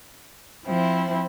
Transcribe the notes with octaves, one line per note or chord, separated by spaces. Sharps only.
F3 C4 E4